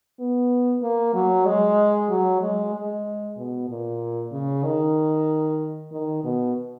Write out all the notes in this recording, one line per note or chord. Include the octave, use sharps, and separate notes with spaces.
B3
A#3
F#3
G#3
F#3
G#3
G#3
B2
A#2
C#3
D#3
D#3
B2